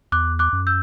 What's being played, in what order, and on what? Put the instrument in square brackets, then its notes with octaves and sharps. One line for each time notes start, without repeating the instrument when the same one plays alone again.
[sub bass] E2 [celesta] D6 F#6
[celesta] D6 F#6
[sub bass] F#2
[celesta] E6 G6